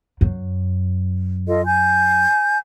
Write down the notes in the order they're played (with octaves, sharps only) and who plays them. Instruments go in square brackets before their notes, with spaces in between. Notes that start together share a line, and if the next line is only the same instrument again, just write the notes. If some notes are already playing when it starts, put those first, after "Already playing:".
[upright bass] F#2
[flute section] F4 A4 D#5
G#5 G6